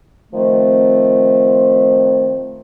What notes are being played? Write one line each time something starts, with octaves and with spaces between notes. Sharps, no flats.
D#3 F3 A3 C4